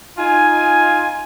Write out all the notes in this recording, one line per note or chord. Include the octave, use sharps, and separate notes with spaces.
D#4 F4 G#5